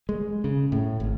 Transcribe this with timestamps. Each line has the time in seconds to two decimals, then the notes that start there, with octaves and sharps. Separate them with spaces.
0.09 G#3
0.44 C#3
0.72 A2
1.00 G#1